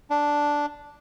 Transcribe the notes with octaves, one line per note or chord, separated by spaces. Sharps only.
D4